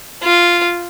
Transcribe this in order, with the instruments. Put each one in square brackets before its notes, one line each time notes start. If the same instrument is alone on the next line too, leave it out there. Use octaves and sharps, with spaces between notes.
[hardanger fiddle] F4